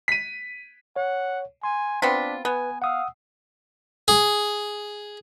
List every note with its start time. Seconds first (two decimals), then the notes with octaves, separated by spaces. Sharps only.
0.08 B6 D#7
0.96 C#5 F#5
1.64 G#5 C6
2.02 B3 C4 D4 F4 B6
2.45 B3 B4 G#5
2.82 F5 F#5 D#6 E6
4.08 G#4